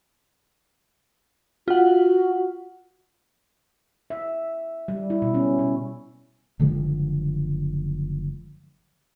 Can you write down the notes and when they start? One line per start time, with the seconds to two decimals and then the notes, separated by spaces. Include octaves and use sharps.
1.68 F4 F#4 F#5
4.10 E5
4.88 G3
5.10 E4
5.22 B2
5.34 C#4
5.59 B2
6.59 F#1 D3 F3 G#3